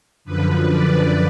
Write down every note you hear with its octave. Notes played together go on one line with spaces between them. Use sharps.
F#2 D3 F3 B4
D5